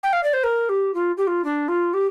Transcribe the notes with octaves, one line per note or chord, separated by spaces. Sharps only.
G5
F5
D5
C5
A#4
G4
F4
G4
F4
D4
F4
G4